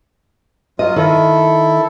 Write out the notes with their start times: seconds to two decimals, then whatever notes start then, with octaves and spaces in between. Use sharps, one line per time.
0.79 F#3 F4 D#5
0.96 D#3 E4 A4